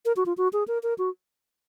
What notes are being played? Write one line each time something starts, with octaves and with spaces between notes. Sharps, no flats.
A#4
F#4
F4
F#4
G#4
A#4
A#4
F#4